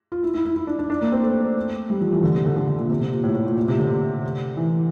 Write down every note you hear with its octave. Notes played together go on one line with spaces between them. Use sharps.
F4
E4
E4
E4
E4
D4
D4
D4
A#3
C4
A3
G3
F3
E3
D3
C3
D3
D3
D3
A#2
C3
C3
A#2
A2
A2
A#2
A#2
C3
D3
E3